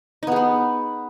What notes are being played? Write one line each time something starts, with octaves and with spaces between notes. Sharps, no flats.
B3 D#4 G#4 B4